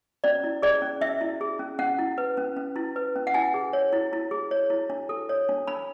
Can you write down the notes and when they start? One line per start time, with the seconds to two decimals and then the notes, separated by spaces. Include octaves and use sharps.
0.24 C#4 D5
0.44 E4
0.62 G#4 D5
0.82 C#4
1.01 C#4 E5
1.21 E4
1.41 G#4
1.59 C#4
1.79 C#4 F#5
1.99 E4
2.18 B4
2.37 C#4
2.57 C#4
2.76 E4
2.96 B4
3.16 C#4
3.27 F#5
3.34 E4 G#5
3.54 G#4
3.73 C#5
3.93 E4
4.13 E4
4.31 G#4
4.51 C#5
4.70 E4
4.90 D4
5.09 A4
5.29 C#5
5.49 D4
5.67 D4 B5